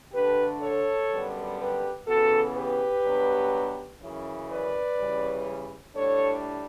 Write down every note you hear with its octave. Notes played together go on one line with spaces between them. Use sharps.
D3 A3 D4 G4 B4
A4 C#5
F#2 D3 G3 B3
G4 B4
C#3 E3 B3 F#4 A4
G4 B4
G2 F#3 B3 D4
F#2 C#3 E3
B4 D5
C#3 E3 G3 C#4
A2 G3 D4 A4 C#5